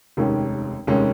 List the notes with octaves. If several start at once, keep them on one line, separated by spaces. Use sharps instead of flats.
F1 D#2 D#3 G#3 C#4
F1 D#2 D#3 G#3 C#4